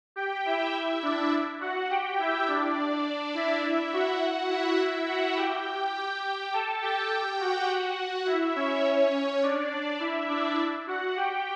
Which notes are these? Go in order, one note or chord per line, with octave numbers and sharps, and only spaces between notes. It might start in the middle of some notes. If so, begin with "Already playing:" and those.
G4 G5
E4 E5
D4 D5
F#4 F#5
G4 G5
E4 E5
D4 D5
E4 E5
F#4 F#5
E4 E5
E4 E5
F#4 F#5
G4 G5
G4 G5
A4 A5
G4 G5
F#4 F#5
E4 E5
C#4 C#5
C#4 C#5
D4 D5
E4 E5
D4 D5
F#4 F#5
G4 G5